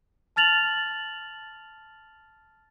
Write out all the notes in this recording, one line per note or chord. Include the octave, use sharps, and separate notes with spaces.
A5 F6 A6 F7 F#7